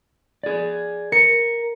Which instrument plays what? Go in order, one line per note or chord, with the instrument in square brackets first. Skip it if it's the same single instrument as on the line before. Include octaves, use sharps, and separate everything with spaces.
[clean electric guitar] G#4 D5
[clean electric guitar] A#4 [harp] C#7